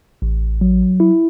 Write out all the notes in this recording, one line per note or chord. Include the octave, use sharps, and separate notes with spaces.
A1
F#3
E4